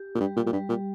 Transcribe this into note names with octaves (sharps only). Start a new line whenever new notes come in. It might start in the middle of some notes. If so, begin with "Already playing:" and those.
Already playing: G4
A#2
G2 G3
A#2
A#2
G2 G3
A#2